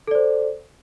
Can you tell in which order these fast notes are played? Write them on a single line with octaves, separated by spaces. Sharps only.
A4 D5 C5